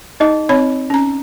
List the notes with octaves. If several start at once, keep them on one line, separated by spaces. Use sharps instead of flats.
D#4 G#4 D#5
C4 C#5 B5
C#4 A#5